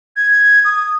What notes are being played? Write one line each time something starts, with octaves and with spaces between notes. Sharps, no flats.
G#6
D#6